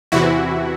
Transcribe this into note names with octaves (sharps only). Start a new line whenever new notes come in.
E2 C3 E3 E4 F#4